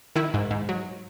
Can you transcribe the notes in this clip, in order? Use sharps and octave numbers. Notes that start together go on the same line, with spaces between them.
D#3 E4
G#2
G#2
F#3